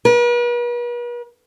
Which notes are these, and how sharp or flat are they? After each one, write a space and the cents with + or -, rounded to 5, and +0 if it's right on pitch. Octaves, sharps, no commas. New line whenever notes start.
B4 -45